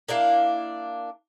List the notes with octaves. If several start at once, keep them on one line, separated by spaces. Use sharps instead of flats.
A#3 D4 E4 F5